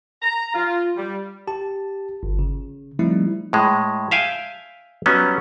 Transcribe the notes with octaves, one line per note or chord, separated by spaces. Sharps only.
A#5
F4
G3
G4 A5
G1
C#3
F3 G3 A3 C4 D#4 E4
A2 G#3
E5 F5 G5 G#5
F#3 G3 B3 C#4 D#4